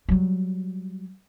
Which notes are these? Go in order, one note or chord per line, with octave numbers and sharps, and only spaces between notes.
F#3 G3